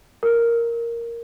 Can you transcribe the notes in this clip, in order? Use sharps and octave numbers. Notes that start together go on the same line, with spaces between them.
A#4